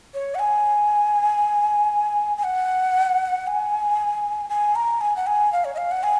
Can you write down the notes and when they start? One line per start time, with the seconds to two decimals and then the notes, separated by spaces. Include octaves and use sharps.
0.14 C#5
0.35 F#5
0.39 G#5
2.38 G#5
2.44 F#5
3.47 G#5
4.49 G#5
4.75 A#5
5.01 G#5
5.16 F#5
5.27 G#5
5.52 F5
5.65 C#5
5.74 D#5
5.77 F5
5.91 F#5
6.03 G#5